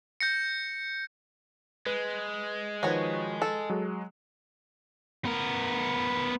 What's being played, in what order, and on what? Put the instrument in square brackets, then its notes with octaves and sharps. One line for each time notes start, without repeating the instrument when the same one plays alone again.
[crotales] G6 A#6 C#7
[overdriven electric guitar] G#3 [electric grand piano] B4
[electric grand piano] D#3 F3 B4 [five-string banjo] F#4 C#5
[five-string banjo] A4
[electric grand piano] F#3 G#3
[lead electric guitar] B3 A#4